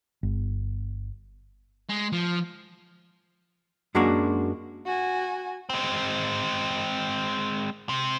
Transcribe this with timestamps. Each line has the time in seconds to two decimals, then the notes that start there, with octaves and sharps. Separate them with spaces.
0.23 G1
1.90 G#3
2.12 F3
3.95 F#2 F#3 G#3 A#3 D4 F#4
4.86 F#4 G#5
5.69 G#3 C4
7.89 C3